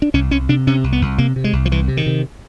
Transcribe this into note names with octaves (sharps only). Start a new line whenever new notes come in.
D4
C2 C#4
C2 C#4
C3 D4
C3 C#4
C2
B3
C2
C3 A#3
C3
G#3
C2
F3
C2 E3
C3
D#3
C3